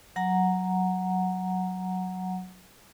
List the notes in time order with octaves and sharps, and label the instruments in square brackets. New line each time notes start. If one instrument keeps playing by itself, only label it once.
[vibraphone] F#3 F#5 A#5